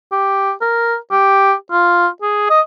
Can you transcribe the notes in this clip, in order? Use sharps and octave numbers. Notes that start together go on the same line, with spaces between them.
G4
A#4
G4
F4
G#4
D#5